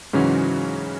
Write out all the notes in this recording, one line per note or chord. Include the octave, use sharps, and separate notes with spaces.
G#2 C#3 E3 F#3 C#4 F#4